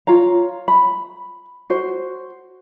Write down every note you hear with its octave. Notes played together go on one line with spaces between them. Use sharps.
F4 C#5 A#5
B5
F#4 C5